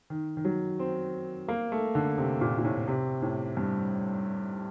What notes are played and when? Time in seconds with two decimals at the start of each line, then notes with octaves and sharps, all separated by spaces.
0.10 D#3
0.37 D#3
0.45 F#3
0.79 C4
1.48 A#3
1.72 A3
1.95 D3
2.18 C3
2.41 A#2
2.59 A#2
2.65 A2
2.88 C3
3.22 A2
3.57 G2